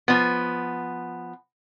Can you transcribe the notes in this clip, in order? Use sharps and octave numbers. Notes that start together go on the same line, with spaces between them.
F3 B3